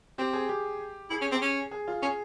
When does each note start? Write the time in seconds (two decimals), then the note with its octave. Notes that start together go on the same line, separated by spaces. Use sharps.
0.18 C4 G4
0.33 G#4
0.49 G4
1.10 E4 G#4
1.21 C#4
1.31 C4
1.42 C#4
1.71 G#4
1.88 F4
2.02 C#4 G#4